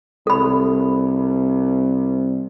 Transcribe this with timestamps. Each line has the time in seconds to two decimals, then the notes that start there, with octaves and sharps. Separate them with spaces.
0.27 C2 A4 B5